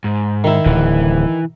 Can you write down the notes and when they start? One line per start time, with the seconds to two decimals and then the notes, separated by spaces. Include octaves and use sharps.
0.04 G#2
0.44 D#3 E4
0.66 D1 E3